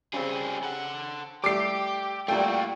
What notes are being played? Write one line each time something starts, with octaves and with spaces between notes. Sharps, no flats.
C#3 G3 C4 G#4
A4 F#5
G3 A3 G4 D6 C7
A#2 G3 A3 F4 F#4 G5